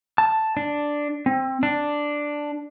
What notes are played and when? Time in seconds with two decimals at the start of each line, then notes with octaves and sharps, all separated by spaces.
0.18 A5
0.57 D4
1.26 C4
1.63 D4